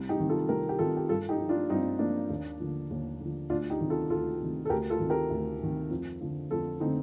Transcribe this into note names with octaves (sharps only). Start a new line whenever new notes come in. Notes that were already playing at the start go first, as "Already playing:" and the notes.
Already playing: C2
D#4 G4
C3 D#3
F4 A4
C2 G4 A#4
G4
C3 D#3 F4 A4
G4
G2 F4 A4
D#4 G4
F3
D4 F4
G2 C4 D#4
F3 A#3 D4
D#2
D3 F3
D#2
D3 F3
D2 D4 F4
D#4 G4
C3 D#3
F4 A4
D2 F4 A4
C3 D#3
A4
D2 G4 A#4
F4 A4
C3 D#3
G4 A#4
D2
C3 D#3
F2
D3 F3
F2 F4 A4
D3 F3 C4 D#4